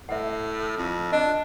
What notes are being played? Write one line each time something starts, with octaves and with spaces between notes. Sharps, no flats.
A2 E5 F#5
F2
D4 D#5